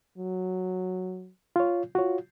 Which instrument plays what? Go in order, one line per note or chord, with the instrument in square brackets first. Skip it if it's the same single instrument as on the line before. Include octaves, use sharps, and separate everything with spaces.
[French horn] F#3
[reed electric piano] F4 C#5
[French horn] F4 [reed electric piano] F#4 C#5